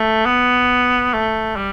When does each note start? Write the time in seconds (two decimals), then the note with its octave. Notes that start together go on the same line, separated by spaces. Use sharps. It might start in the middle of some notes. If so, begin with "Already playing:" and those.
Already playing: A3
0.26 B3
1.14 A3
1.56 G3